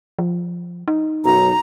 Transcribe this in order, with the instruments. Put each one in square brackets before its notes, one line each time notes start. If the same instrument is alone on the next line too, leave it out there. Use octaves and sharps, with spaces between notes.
[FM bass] F3
D#4
[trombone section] B1 F#2 [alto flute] A#5